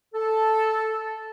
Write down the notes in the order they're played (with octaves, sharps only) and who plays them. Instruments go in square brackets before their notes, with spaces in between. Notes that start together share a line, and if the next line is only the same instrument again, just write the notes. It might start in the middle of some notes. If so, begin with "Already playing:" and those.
[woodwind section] A4